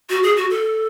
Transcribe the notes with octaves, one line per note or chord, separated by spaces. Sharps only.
F#4
G#4
F#4
A4